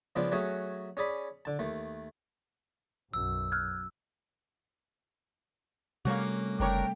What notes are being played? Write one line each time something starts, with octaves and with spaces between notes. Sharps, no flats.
C#3 F3 G#3 B3 D4
F#3 A3 C#4 F#4 G#4
C#4 G#4 D5 B5
D3 A5
D#2 A3
B1 F#2 E6
F6 F#6 G#6
C3 G3 A3 A#3 C#4 F#4
F#1 D4 A#4 C#5 G5